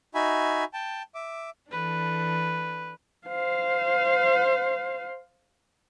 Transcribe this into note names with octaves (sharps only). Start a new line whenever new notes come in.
D#4 F#4 E5 G#5 B5
G5 A5
E5 D6
E3 D4 A4 B4
C5 F5